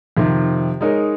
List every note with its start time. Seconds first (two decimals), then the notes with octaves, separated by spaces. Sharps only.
0.17 F2 C3 D#3
0.81 G#3 D#4 A#4 C#5